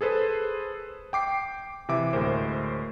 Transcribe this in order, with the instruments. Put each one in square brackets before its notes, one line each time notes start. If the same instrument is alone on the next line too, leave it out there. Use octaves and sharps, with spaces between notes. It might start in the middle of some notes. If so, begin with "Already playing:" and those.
[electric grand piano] G#4 A4 B4 C5
G5 D6 C7
C3 E3 E5 D6
D2 A2 G#3 A#4 C5